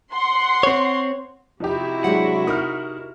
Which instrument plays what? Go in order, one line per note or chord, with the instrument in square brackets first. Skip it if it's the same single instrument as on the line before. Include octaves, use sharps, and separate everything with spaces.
[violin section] F#5 C6
[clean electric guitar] C4 C#5
[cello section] C3 E4 F#4 [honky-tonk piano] F3 D#4 G4
[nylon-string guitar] F#3 G#3 D4 [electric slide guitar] F#5
[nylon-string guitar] D#4 A#4 [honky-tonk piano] D#6 F6